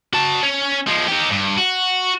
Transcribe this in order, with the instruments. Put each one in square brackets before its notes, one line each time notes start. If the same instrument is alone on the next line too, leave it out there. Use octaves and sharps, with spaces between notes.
[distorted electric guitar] F#4 A5
C#4
F3 G#3
D#4 G4
G2
F#4